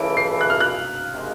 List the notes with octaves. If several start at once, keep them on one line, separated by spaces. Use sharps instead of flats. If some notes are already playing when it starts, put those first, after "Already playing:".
Already playing: C#2 C#3 E3 A3 D7
C7
F#6
F6
F#6
C3 D#3 G#3